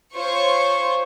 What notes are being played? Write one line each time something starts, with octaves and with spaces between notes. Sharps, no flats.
F4 C5 C#5 C#6